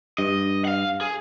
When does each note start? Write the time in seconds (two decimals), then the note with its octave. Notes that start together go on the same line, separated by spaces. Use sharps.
0.18 G2 D#5
0.65 F5 F#5
1.01 G#4